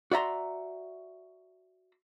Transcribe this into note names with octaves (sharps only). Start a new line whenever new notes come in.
F#4 D5 E5 A#5 C6